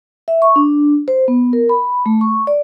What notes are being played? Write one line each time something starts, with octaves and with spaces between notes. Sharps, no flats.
E5
C#6
D4
C5
B3
A#4
B5
A3
C#6
D5